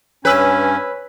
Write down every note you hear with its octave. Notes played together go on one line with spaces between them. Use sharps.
G2 C#4 B4 C#5 G#5 E6 F6